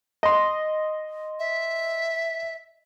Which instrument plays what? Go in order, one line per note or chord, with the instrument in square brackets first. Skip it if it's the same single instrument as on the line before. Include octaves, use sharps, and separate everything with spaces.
[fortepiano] D#5 C6
[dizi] E5